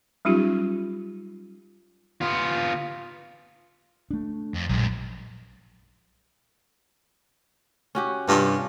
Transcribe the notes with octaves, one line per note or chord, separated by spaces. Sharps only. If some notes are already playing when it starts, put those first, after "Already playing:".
F#3 G3 C#4 D#4 F4 G4
B3 F4
A3 D4
F2
A#1 F#2 G#3
C#4 F#4 G4
G2 C3 C#4 F4